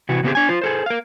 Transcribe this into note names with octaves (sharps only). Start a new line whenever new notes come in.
C3 E3 F#4
C#3 B3 C4 D#4 G4 G#4
D4 G#5
F4 C5
G#4 A4 C5
A#4 F5